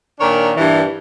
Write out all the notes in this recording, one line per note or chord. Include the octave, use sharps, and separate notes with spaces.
A#2 D#3 D4 A#4 C#5
G2 A#2 E3